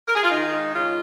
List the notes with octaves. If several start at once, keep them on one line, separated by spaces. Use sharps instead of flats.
A#4
G#4
F4
D#3 D#4
G#3
C#3 F4